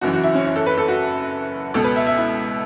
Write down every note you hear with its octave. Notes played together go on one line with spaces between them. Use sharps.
F#1 F#2 E3 F#4
F#4
E4
C#4
E4
A4
B4
A4
F#4
C#2 B2 A4
B4
E5
E5
E4